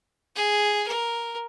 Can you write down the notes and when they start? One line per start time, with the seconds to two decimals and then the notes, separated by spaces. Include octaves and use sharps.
0.36 G#4
0.88 A#4